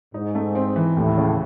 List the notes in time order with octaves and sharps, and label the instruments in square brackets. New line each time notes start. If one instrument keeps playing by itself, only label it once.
[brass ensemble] G#2 [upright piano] D#4
[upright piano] A3
C4
E3
[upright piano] D#2 [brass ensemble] A2
[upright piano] C#3